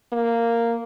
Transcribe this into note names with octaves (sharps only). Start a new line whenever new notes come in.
A#3